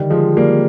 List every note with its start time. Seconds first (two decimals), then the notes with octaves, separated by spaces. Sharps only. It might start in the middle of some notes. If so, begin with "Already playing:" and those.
Already playing: D3 D#3 G3
0.10 F3 G#3
0.37 G3 A#3